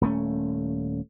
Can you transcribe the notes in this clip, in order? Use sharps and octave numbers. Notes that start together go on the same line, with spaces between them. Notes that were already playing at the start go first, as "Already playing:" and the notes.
D#1 A3 C#4